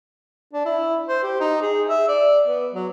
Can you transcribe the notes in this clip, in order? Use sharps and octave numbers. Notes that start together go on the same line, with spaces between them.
D4
E4
C5
G4
D#4
G#4
E5
D5
B3
F#3